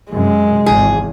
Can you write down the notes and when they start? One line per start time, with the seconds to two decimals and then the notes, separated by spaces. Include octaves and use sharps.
0.12 F#2 C3 G#3
0.66 G#1 E2 G#4